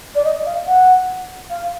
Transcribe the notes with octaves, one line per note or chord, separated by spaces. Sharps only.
D5
D#5
F5
F#5
F5